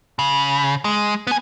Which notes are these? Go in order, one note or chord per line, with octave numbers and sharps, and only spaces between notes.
C#3
G#3
B3 G#5